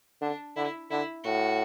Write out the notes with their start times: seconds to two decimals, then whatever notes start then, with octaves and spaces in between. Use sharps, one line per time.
0.21 D3 D4
0.56 D3 E4
0.91 D3 E4
1.25 A2 F#4